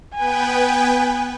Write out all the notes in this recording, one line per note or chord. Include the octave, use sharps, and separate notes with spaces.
B3 B4 G5 G#5